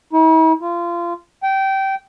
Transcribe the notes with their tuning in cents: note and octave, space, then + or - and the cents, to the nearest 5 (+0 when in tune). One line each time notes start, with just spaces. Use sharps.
E4 -45
F4 -25
G5 -20